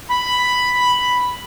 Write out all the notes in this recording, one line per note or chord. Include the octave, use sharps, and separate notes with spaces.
B5